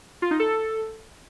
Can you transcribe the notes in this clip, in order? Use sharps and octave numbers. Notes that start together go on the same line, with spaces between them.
F4
D#4
A4